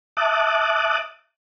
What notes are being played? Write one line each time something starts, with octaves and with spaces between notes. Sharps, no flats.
E5 A5 D6 D#6 F#6